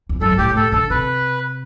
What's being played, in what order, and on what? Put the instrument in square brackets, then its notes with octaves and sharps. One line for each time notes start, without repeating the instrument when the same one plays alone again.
[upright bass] E2
[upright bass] F#2 [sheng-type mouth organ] A4
[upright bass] G2
[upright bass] A2 [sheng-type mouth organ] G4
[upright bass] A2 [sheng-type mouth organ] A4
[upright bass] D3 [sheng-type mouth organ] A4
[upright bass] C3 [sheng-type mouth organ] B4